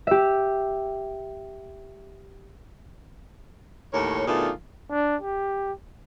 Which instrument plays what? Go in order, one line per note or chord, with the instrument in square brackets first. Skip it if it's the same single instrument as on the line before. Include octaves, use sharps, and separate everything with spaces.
[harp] G4 E5
[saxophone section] D#2 A2 A#4 C#5
B2 D#3 A3 D4 F4 G#4
[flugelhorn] D4
G4